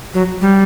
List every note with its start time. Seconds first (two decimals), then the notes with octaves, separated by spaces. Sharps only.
0.14 F#3
0.41 G3